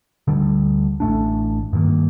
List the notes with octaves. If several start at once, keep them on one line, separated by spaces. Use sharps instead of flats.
D2 D3 G3
A1 A2 A3 D4
G2 D#3 A#3